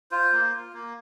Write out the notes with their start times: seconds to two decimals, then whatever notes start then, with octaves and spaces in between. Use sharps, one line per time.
0.11 F4 C5
0.33 A#3
0.53 F4
0.73 A#3